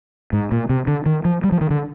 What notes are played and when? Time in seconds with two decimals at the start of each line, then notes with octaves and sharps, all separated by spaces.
0.33 G#2
0.52 A#2
0.70 C3
0.87 D3
1.06 D#3
1.25 F3
1.44 G3
1.52 F3
1.61 D#3
1.70 D3